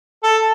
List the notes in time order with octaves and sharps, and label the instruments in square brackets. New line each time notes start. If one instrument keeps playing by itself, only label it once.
[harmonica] A4